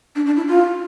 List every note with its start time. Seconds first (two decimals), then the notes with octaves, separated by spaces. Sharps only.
0.16 D4
0.26 D4
0.36 E4
0.48 F4